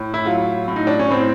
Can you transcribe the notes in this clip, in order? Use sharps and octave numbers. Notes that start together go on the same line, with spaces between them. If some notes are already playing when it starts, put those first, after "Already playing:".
Already playing: A2
E4
F#3 F4
A2
D#4
D4
C#4
A2 C4